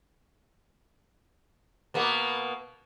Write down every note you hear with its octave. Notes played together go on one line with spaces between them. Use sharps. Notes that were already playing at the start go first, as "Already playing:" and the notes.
B2 A#3 B3